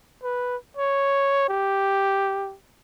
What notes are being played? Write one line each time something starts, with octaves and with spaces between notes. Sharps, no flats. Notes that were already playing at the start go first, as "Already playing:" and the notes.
B4
C#5
G4